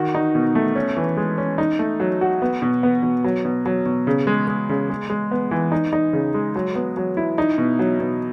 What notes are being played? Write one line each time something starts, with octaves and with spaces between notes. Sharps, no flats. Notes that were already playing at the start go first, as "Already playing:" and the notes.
Already playing: D#3 F#4
D#4
B2
A3
C#4
E3
G#3
C#4
D#4
A3
F#3
F#4
B3
B2
B3
B2
F#3
B2
F#3
B2
C#3
G#3
G#3
C#3
G#3
G#3
B3
E3
D#4
D#4
C#3
G#3
F#3
B3
F#3
E4
D#4
B2
F#3
B2